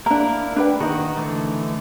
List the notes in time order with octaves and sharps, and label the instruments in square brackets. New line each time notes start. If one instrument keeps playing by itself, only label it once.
[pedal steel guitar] A#3 E4 A#4 [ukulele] D4 A#5
[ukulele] D4 B4 G5
[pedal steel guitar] D#3 F#4 [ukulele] D#4 A#4
[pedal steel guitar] D3 E3 A3